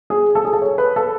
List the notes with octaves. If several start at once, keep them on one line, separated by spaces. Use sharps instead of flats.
G#4
A4
G#4
A4
C#5
B4
A4